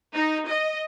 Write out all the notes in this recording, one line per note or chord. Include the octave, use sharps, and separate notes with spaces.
D#4
D#5